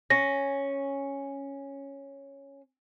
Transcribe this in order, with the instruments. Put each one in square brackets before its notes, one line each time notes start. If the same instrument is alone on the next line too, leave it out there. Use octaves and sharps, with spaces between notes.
[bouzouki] C#4 [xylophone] A#6